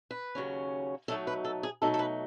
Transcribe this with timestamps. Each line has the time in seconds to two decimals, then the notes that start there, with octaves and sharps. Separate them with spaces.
0.11 B4
0.35 D#2 C#3 F#3 C#4
1.08 B2 F#3 A3 D#4 A4
1.27 B4
1.44 A4
1.63 G#4
1.82 B2 F#3 A3 D#4 A4
1.94 A4
1.99 B4